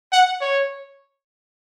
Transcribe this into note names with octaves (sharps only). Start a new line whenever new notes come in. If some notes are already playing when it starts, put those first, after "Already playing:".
F#5
C#5